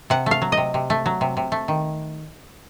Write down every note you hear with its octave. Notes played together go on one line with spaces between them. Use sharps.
C3 F#5
A3 F5
F#3
D#5
C3
C3
A3
F#3
C3
C3
A3
D#3